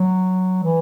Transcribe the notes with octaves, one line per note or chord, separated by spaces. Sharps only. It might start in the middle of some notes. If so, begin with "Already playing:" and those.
Already playing: F#3
E3